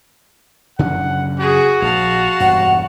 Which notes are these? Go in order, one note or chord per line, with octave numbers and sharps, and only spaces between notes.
F#2 C#3 D4 F#5
F#4 G#4
A#1 F5 A5
E1 G2 F#5